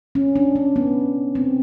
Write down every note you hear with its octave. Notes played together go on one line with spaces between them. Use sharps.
C#4
D4
C#4
B3
C4